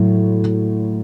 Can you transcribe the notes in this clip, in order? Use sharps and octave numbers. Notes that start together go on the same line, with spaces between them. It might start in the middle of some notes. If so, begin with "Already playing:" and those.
Already playing: A2 F#3